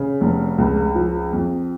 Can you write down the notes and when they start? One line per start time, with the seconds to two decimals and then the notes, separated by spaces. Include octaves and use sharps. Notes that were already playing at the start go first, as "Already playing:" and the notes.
Already playing: C#3
0.21 F1
0.58 C#2
0.95 F3
1.33 F2